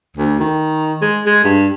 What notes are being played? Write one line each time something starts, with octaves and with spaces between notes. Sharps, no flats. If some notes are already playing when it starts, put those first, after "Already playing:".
D2
D#3
G#3
G#3
G2